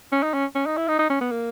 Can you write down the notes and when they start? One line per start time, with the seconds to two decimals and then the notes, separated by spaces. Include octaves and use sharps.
0.12 C#4
0.23 D#4
0.34 C#4
0.55 C#4
0.67 D#4
0.77 E4
0.88 D#4
0.99 D#4
1.10 C#4
1.21 B3
1.31 A#3